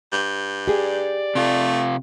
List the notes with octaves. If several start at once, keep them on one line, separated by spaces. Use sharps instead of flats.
G2
G4 G#4 D5
C3 A3 F4